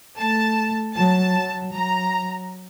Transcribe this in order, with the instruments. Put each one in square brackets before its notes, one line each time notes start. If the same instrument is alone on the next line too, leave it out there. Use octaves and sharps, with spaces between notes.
[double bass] A3 [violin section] A5
[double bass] F#3 [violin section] A5
[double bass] F#3
[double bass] F#3 [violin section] A#5